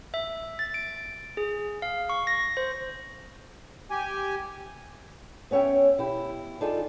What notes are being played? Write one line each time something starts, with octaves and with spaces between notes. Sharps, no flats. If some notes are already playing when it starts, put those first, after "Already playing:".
E5
A6
D7
G#4
F5
C#6
A#6
C5
G4 G#5
B3 C#4 C#5 E5 G5
B2 E4 G4
D4 D#4 F4 G#4 A4 D5